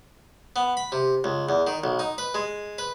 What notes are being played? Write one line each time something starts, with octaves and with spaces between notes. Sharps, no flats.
B3
B5
C3
C#2
E2
D#3
B1
D#4
B4
G#3
B4